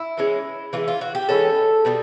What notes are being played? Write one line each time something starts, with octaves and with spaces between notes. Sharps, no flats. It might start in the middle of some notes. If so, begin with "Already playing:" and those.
Already playing: E4
E3 G#3 C#4
E3 G#3 C#4 F4
F4
F#4
G4
E3 G#3 C#4 A4
B2 G3 B3